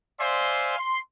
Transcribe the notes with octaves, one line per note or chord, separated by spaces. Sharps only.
C5 D5 E5 F5 G#5 C6
C6